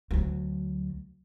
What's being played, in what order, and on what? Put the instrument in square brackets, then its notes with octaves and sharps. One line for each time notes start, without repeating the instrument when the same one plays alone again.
[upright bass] D2 F#3